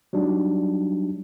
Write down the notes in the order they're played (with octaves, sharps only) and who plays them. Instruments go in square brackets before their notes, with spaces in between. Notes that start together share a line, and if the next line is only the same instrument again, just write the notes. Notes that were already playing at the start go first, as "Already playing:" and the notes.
[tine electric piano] F#3 G3 D4 D#4